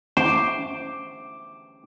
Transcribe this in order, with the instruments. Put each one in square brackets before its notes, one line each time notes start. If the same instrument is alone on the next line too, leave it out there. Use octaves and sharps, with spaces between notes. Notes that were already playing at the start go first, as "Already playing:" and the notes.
[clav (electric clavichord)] C5 [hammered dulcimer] D6